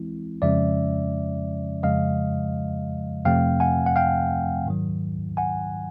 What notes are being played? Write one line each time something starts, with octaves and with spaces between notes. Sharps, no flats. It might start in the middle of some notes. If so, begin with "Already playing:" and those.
Already playing: E3 G#3 C4 E4
F2 C#3 F3 G#3 C#4 D5 E5
F2 C#3 F3 G#3 D#5 F5
F2 C3 F3 A3 C4 F5 G5
F#5 G#5
F#5
F5 G5
G#2 D#3 F#3
F#5 G#5